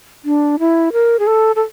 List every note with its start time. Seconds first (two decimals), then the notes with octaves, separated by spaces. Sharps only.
0.25 D4
0.59 E4
0.93 A#4
1.19 G#4
1.27 A4
1.56 A4